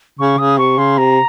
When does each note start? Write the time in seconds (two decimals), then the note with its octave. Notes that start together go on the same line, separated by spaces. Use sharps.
0.19 C#3 C#6
0.38 C#3 D#6
0.58 C3 C#6
0.78 C#3 C6
0.98 C3 A#5